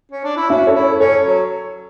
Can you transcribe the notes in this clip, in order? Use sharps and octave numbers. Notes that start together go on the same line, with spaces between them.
C#4
D4
E4
C#4 E4 F#4
A4 C#5
E4
A4 C#5
C#4 A4 C#5
F#3